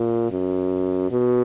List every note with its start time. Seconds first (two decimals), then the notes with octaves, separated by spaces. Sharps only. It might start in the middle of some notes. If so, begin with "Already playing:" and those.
Already playing: A#2
0.31 F#2
1.11 B2